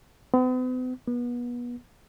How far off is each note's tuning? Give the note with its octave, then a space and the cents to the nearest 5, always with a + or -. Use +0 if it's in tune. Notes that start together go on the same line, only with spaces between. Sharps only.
B3 +45
B3 -30